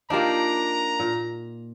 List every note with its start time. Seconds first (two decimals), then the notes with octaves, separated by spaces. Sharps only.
0.10 A#3 D4 D#4 F4 G4 A#5
1.00 A#2